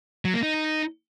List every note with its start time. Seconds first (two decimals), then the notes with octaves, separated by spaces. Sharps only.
0.25 F#3
0.34 A#3
0.43 D#4